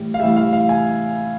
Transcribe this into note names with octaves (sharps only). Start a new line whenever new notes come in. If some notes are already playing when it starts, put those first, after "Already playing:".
Already playing: A2 E3 G3
F5
A2 E3 G3 E5
F5
F5
G#5